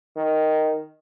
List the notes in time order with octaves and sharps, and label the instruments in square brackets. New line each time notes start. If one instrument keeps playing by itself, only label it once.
[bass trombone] D#3